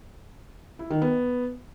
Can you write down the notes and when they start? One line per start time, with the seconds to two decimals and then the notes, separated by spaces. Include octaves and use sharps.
0.79 E4
0.90 D#3
1.02 B3